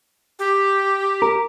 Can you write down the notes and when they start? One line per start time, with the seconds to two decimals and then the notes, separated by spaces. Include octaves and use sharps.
0.39 G4
1.22 A#4